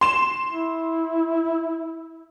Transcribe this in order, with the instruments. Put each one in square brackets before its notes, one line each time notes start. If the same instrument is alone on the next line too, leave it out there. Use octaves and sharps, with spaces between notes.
[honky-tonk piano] C6 E7
[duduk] E4